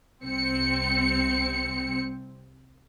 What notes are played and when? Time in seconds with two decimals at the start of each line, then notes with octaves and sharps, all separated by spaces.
0.22 C2 C4 C#7